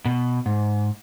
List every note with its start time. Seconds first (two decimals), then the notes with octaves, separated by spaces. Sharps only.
0.05 B2
0.46 G#2